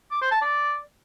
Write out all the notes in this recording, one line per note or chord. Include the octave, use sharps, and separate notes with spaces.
D6
C5
A5
D5